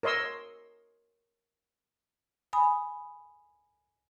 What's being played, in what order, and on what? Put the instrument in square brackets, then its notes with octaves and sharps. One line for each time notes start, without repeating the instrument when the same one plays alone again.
[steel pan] A#4 C#5 D#5 C6 E6
[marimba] G#5 B5 D#6